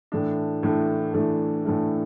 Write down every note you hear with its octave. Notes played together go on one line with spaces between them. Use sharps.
A2 E3 A3 D4
A2 E3 A3 D4
A2 E3 A3 D4
A2 E3 A3 D4